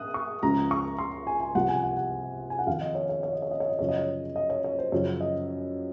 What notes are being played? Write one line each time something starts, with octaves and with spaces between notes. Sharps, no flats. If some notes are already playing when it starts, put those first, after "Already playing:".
Already playing: D#6 F6 F#6
C#6
C#2 C#3 F3 A#5
C#6
C6
G#5
G#5
C2 C3 F3 F#5
G#5
F#5
F#5
G#5
F#5
F2 D#3 F5
D#5
C#5
C#5
C#5
D#5
C#5
D#5
C#5
D#5
F#2 C#3 F3 C#5
D#5
C#5
D#5
C#5
C#5
C5
F#2 C#3 F3 C#5
D#5